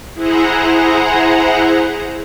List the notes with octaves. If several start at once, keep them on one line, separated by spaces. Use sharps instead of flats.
E4 G#4 C5 F#5 A#5